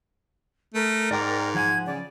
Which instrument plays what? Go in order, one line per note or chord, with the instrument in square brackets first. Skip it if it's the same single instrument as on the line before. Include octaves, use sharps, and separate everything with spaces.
[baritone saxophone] A3 [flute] A#4
[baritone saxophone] G#2 [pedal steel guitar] D5 G5 D6
[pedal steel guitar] F3 F#5 G#5 [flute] G#6
[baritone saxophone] C#3 [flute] D5